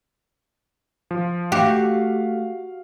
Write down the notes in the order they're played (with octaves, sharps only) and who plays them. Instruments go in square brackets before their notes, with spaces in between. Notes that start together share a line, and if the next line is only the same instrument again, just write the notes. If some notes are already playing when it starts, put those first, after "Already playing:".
[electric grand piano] F3
[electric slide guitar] A3 [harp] F#4 C7 [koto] G4 [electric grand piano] F5